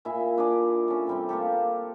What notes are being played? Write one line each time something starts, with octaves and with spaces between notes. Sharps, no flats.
A#2 E4 G#4 E5
D4 G#4 A#4 D5
C#4 A4
C3 G3 C4
A#3 F4 G4 A4